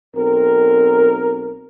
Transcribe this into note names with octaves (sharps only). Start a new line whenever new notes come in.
B1 C4 A#4